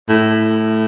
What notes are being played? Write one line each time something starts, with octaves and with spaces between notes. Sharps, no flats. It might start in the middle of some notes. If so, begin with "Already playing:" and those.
A2